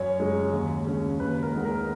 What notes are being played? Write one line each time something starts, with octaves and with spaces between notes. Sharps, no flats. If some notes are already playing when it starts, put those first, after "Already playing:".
Already playing: F#2 C#5
C#3 G#3
D#2
C#3 G#3 C#4
D#2 B4
A#4
D#3 G#3 B3
A#4